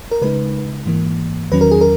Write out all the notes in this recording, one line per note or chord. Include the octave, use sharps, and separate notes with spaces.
A#4
C#3 G#3 D#4 B4
G#2 E3 A#3
E2 D#3 F#3 C#4 B4
A#4
G#4
A#4